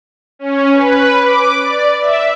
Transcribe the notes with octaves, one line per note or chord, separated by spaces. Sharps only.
C#4
B4
D6
D5
E5